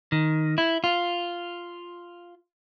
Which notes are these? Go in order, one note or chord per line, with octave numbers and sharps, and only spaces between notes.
D#3
E4
F4